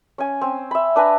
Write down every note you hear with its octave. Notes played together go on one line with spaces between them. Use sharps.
C#4 G#5
C4
E5 B5
D4 B4 G#5 A#5